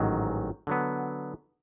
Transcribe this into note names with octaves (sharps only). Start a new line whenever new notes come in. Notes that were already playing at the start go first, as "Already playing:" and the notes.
Already playing: A1 G#2 D#3 F#3
D3 F#3 B3